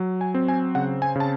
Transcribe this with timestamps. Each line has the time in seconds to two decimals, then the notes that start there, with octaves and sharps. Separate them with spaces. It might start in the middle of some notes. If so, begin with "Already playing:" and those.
Already playing: F#3
0.21 G#5
0.34 C4
0.48 G#5
0.75 C#3 F#5
1.02 G#5
1.16 C#3 A5